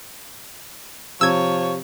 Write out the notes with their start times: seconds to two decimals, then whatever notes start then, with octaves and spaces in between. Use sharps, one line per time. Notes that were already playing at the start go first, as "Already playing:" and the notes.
1.21 C3 F3 C#5 E6 G#6